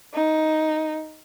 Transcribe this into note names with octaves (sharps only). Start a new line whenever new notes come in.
D#4